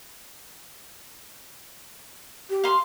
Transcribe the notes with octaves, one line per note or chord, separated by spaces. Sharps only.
G4
F5 C6